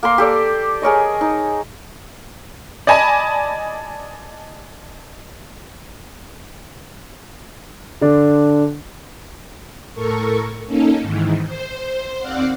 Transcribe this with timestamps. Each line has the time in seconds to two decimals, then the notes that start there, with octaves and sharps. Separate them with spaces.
0.03 A#3 A#4 C6
0.18 G4 A4 D5
0.82 G#4 A#4 C#5 D#5
1.21 D#4
2.87 D5 D#5 G#5 A5 B5
8.01 D3 D4
9.94 A2 A4 A#4 C#6
10.66 A#3 C#4 D#4 A4
11.01 G#2 D#3 E3
11.46 C5
12.19 D#2 C4 D5 F5 F#5